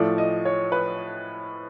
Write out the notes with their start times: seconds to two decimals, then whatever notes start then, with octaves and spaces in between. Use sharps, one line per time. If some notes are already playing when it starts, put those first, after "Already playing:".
Already playing: A2 F3 A3 D5
0.18 D#5
0.45 C#5
0.72 B4